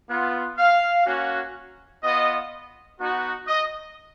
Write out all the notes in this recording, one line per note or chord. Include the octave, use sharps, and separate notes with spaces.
B3 F4
F5
A#3 C#4 F#4
B3 F4 D#5
B3 D#4 F#4
D#5